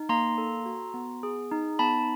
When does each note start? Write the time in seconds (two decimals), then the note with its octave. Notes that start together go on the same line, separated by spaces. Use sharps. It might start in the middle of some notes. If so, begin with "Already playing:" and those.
Already playing: D#4
0.09 A#3 A#5 C6
0.38 A4
0.66 F#4
0.94 B3
1.23 G#4
1.52 D#4
1.79 B3 A5 B5